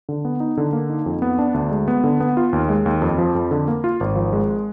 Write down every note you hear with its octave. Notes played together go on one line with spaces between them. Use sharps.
D3
B3
D#4
D3
A#3
D#4
F2
B3
D4
D2
G#3
B3
D3
B3
F4
D#2
G#3
D#2
F2
F3
F2
D3
A#3
F4
G#1
F3
G#3